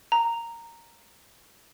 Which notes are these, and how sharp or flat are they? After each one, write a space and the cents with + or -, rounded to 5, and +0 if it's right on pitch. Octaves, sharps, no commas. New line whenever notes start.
A#5 -10